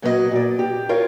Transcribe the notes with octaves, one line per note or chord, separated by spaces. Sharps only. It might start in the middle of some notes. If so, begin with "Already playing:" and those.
A#2 F#3 B3 F#4 G4 D#5
A#2 D5
G4
F4 A#4 C#5 F5